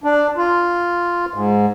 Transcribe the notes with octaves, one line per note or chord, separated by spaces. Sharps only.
D4
F4
G#2